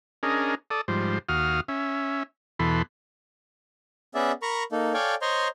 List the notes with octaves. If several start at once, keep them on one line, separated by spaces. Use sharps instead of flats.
C#4 D4 G#4 A#4 D#5
A4 D5 D#6
G#2 F3 G3 C5
D#2 F#4 F5 D#6 F6
C#4 E5
E2 B2 E3 A4 B5 C6
B3 C#4 G#4 D5 E5
A#4 A#5 B5 C#6
A#3 D#4 A4
A4 C#5 D5 F5 G5 G#5
C5 C#5 D#5 A#5 C6